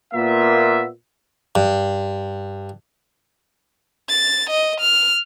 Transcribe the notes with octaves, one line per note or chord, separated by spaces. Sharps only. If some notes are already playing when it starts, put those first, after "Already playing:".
A#2 A#3 B3 F4 E5
G2
A6
D#5
F6